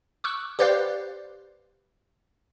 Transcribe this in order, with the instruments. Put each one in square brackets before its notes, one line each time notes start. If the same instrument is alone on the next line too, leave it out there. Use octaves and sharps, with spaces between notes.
[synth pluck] C#6 D6 E6 F#6
G4 B4 C5 D5 F5